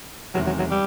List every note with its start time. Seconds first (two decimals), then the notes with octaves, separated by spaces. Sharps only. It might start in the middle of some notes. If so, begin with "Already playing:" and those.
0.34 E2 C3 D#3 F#3 G#3
0.46 F#3
0.59 F#3
0.71 G3